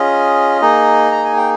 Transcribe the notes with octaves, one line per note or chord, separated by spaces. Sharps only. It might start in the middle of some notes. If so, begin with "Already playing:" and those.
Already playing: C#4 F4 G#4 D#5
A#3 D#4 G#4
A#5
G#5
G5